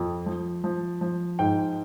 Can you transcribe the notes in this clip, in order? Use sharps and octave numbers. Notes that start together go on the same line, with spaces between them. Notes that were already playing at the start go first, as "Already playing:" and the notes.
Already playing: F2
F3
F3
F3
G#2 G5